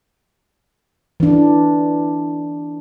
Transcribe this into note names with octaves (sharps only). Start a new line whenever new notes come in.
E3 D4